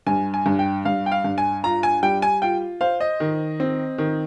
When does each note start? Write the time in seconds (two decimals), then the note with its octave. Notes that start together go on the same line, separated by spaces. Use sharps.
0.07 G2 G#5
0.34 G#5
0.46 G2
0.59 G5
0.85 G2 F5
1.06 G5
1.12 F5
1.24 G2
1.38 G#5
1.64 F4 A#5
1.83 G#5
2.03 G3 G5
2.22 G#5
2.42 F4 G5
2.81 C5 F5
3.00 D#5
3.20 D#3
3.60 C4
3.98 D#3